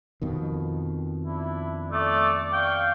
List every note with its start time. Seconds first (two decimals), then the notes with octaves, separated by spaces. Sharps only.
0.22 F2 B2 D#3
1.27 D4 E4
1.92 A3 D5
2.53 F5 G5 C#6